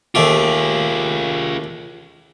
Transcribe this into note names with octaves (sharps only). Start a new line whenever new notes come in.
D#2 A3 F4 G4 G#4